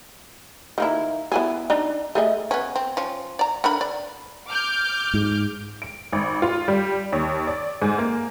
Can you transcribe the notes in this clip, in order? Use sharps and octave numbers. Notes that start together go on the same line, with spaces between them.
D#3 A#3 E4
B3 E4 G#4
D4 D#4
A3 G#4 D#5
B3 C#4
C4
F3 C#4
D5 A#5
D3 A#4 B5
D5
D6 F6 G6
G#2
D7
G#1
F4
G3
D#2
D5
G#2
A#3